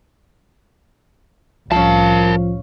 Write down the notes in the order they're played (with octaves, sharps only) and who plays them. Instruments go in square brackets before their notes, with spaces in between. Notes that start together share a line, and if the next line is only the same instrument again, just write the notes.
[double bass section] C2 A2 [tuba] F3 [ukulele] C#4 F5 [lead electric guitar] A#4 A5